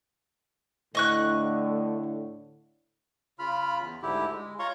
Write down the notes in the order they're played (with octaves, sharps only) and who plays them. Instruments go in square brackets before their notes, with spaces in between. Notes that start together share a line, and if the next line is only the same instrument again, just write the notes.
[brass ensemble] A2 D3 [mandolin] D#5 C#6 F#6
[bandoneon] C#3 F4 B5 F6
E2
D2 G#2 D3 E4 G4
G#3
F4 C#5 F5 A#5 C6 C#6